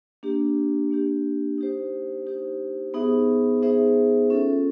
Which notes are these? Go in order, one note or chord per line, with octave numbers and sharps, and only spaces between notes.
A#3 D4 G4
A#3 D4 G4
D#4 G4 C5
D#4 G4 C5
B3 D#4 G#4 C5 E5
B3 D#4 G#4 C5 E5
C#4 F4 A4